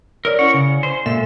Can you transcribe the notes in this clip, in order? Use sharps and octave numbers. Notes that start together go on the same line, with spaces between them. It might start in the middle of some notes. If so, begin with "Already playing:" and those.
A#4 C#5 D5
C#4 E4 F#5
C#3 G#5
C5
A#2 G#3 A4 E5